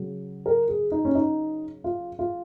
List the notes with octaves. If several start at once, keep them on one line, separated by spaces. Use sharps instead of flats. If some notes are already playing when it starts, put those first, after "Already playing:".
Already playing: C#3 F#3
A#4
G#4
D#4
C#4
D#4
F4
F4